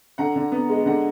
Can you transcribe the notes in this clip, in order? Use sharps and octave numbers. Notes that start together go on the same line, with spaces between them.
D3 F#5 A#5
D3
B3
G#3
D3 F#5 A#5